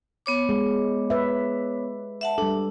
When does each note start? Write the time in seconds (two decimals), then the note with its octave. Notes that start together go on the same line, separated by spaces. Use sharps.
0.26 B3 C#5 D6
0.49 G#3
1.10 B4 E5
2.21 E5 F#5 A5
2.38 G3 D4 A4